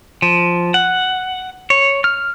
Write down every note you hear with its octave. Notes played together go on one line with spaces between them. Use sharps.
F3
F#5
C#5
F6